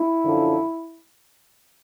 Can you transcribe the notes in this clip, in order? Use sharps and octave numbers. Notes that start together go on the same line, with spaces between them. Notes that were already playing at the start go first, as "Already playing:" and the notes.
Already playing: E4
F#2 D3 F3